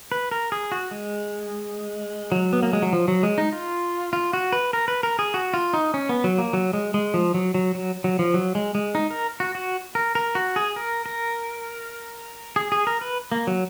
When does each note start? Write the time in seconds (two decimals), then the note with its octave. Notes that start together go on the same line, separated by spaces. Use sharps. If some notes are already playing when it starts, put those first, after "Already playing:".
0.12 B4
0.31 A#4
0.52 G#4
0.72 F#4
0.91 G#3
2.32 F#3
2.53 B3
2.63 A#3
2.73 G#3
2.82 F#3
2.93 F3
3.08 F#3
3.23 G#3
3.38 D#4
3.52 F4
4.13 F4
4.33 F#4
4.53 B4
4.73 A#4
4.88 B4
5.03 A#4
5.19 G#4
5.34 F#4
5.54 F4
5.74 D#4
5.94 C#4
6.09 B3
6.24 F#3
6.38 A#3
6.53 F#3
6.73 G#3
6.94 G#3
7.14 F3
7.34 F#3
7.54 F#3
7.75 F#3
8.04 F#3
8.19 F3
8.34 F#3
8.55 G#3
8.75 G#3
8.95 D#4
9.10 A#4
9.40 F#4
9.55 F#4
9.95 A#4
10.15 A#4
10.35 F#4
10.56 G#4
10.76 A#4
11.06 A#4
12.56 G#4
12.72 G#4
12.87 A#4
13.01 B4
13.32 A#3
13.47 F#3